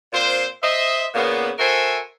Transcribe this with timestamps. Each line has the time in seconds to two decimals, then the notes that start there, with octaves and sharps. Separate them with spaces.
0.13 A#2 C4 F4 C5
0.62 C5 D#5 E5
1.14 A#2 C#3 A#3 B3
1.59 F#4 A4 A#4 C5 E5 G#5